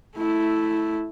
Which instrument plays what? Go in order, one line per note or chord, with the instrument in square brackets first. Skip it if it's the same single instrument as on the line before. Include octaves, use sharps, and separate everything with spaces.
[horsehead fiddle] A3 E4